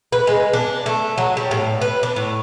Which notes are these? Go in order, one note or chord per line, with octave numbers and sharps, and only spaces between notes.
B4
G#3
D4
A3
F#3
G3
A2
B4
D4
A2